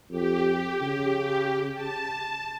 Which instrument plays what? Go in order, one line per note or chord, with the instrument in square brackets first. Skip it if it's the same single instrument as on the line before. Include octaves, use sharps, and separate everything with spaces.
[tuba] F2 [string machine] G4
[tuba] C#3
[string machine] A5